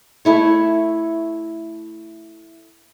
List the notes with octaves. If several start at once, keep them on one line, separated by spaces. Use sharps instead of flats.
A3 E4 C#5